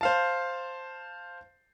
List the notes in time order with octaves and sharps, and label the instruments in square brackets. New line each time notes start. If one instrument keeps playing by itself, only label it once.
[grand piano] C5 F5 A5